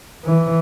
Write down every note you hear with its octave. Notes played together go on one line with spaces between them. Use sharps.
E3